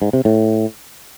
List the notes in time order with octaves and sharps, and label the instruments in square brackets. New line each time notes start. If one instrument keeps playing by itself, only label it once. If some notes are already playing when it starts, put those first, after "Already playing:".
[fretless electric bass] G#2
C3
A2